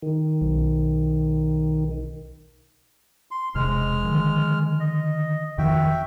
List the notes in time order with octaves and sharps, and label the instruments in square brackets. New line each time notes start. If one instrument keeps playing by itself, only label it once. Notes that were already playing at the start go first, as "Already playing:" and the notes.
[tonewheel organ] D#3
[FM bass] B1
[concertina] C6
[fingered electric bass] E1 C3 [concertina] G#3 F6
[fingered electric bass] D3 D#3 F3
[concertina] D#5
[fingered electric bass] F2 D#3 F3 [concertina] F#4 E5 G5